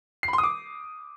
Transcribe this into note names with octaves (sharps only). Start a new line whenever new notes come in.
C7
B5
C6
D#6
D6